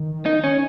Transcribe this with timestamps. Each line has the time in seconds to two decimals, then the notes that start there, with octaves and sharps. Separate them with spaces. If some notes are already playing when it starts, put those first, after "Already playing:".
Already playing: D#3
0.26 D#4
0.44 C#4